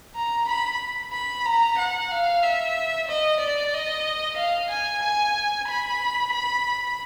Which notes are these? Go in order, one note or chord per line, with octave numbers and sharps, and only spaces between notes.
A#5
B5
B5
A#5
F#5
F5
E5
D#5
D5
D#5
F5
G#5
G#5
B5
B5